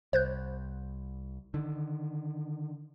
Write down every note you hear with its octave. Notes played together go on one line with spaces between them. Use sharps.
C2 C5 F#6 G6
D3 D#3